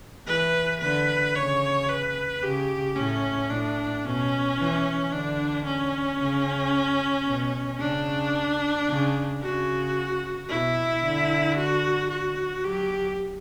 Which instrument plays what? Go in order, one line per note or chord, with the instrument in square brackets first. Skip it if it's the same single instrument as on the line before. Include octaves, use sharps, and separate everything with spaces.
[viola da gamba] E3 [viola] B4
[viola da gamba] D3 [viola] B4
[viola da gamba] C#3 [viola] C#5
[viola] B4
[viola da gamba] C#3 [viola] G4
[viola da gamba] A2 [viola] C#4
[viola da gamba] A2 [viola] D4
[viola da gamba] B2 [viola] C#4
[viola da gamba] E3
[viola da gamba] D3 [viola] D4
[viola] C#4
[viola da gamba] C#3
B2
[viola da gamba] C#3 [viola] D4
[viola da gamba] C#3
[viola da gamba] C#3 [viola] F#4
[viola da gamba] B2 [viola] E4
[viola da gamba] D3
[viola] F#4
F#4
[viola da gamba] F#3 [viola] G4